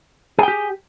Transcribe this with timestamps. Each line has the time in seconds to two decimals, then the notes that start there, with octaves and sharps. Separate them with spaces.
0.39 G#4
0.43 G5
0.48 G4